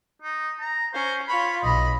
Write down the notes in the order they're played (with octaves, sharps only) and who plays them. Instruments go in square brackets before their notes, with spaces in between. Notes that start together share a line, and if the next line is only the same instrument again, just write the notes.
[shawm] D#4
A#5
[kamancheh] C#4 [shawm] C5
[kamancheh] F4 C#5 [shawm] B5
[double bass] B1 [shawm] D#5 [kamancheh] B5